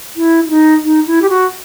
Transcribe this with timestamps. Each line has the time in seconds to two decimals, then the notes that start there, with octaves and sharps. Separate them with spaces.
0.16 E4
0.46 E4
0.50 D#4
0.84 D#4
1.07 E4
1.22 G4
1.29 F#4